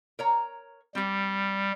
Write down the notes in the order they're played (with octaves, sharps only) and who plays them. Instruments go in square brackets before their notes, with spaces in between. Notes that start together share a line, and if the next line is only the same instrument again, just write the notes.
[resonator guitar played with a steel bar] A#4 C#5 A#5
[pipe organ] G3 [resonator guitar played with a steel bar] C4 G4